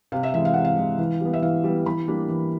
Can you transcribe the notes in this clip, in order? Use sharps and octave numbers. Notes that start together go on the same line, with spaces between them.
C3 F5
E5
E3 G#3 E5
F5
C3 F#5
F5
E3 G#3
E3
G3 B3
E5
E3 F5
G3 B3
E3 B5
G3 A#3 D4
E3